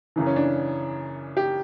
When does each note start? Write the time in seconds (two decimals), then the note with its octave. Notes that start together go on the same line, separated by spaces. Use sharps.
0.16 F#2 C#3 E3
0.26 C#4
0.36 D4
1.37 G4